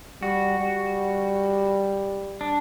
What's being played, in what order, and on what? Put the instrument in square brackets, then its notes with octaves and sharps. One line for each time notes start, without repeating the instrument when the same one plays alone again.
[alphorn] G3 [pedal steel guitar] F#4
[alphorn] G3
[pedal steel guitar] D4